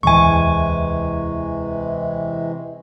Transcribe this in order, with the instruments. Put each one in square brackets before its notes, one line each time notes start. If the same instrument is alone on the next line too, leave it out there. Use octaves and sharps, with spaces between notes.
[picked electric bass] D1 E2 [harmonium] C3 E3 G#3 [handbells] G#5 C#6